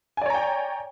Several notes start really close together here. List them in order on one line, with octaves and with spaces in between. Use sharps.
G#5 D5 C#5 A#5 G5